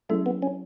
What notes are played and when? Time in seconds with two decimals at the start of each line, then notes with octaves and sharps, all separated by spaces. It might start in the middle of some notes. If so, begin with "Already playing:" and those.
0.09 F#3 A3 C#4 E4 G#4
0.26 B3
0.42 C#4